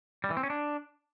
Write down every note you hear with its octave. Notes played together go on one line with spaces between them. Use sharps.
G3
E3
C4
C#4
D4